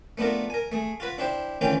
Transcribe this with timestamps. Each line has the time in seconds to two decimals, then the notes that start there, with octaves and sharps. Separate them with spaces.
0.18 A3 B3 D4 F4 A#4
0.50 A#4 G#5
0.72 A3 G#4
1.00 F4 F#4 B4
1.18 D4 E4 G4 C5
1.61 D2 D#3 E3 C#4 F4 G5